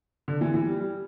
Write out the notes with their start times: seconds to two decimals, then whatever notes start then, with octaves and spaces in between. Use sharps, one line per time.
0.28 D3
0.41 E3
0.54 E3
0.66 G3
0.80 G3